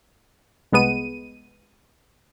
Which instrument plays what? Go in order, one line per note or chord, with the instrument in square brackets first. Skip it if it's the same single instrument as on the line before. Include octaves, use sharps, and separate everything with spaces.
[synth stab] C2 G#3 B3 D#7